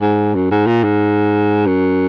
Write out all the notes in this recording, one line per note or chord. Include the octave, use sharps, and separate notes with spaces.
G#2
F#2
G#2
A#2
G#2
F#2